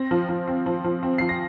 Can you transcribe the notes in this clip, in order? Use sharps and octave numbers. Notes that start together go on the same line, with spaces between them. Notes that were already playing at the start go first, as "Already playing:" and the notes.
Already playing: C4 A#6
F3
F3
C4
F3
F3
C4
F3 C7
A#6